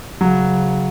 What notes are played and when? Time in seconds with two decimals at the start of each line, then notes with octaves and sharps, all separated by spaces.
0.21 C#3 F#3